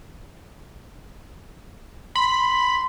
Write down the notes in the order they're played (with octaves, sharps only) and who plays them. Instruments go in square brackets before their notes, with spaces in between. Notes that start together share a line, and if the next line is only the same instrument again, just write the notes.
[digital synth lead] B5 [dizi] C6